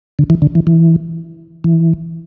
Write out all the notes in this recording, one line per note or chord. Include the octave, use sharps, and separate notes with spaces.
D3
E3
D3
E3
E3
E3